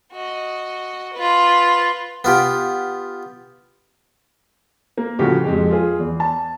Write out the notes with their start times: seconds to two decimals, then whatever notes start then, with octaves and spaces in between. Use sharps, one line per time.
0.12 F#4 D#5
1.13 F4 B4
2.24 B3 F4 G4
4.97 A#3
5.19 A2 C#3 F3 F#4 G4
5.44 F2 G#3 G4
5.71 F4 G#4
5.99 E2
6.20 A5